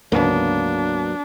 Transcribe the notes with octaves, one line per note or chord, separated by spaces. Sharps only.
D2 G#2 C#3 F#3 A#3 B3 D4